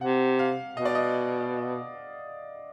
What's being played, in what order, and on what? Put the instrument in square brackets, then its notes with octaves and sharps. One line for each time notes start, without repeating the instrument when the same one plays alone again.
[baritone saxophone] C3 [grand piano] F#5
[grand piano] F5
[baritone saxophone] B2 [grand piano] D#5
[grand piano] D5
D#5